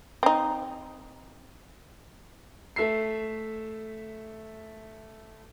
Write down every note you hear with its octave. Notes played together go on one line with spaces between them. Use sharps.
C4 D#4
A3 E5 C7